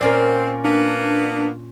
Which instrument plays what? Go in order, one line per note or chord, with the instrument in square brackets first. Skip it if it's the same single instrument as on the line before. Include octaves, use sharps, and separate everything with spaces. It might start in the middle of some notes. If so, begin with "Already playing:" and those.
[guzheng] A#2 C#4 F5 [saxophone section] C4 [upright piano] A#4 D5
[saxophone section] A#3 B3 [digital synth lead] D4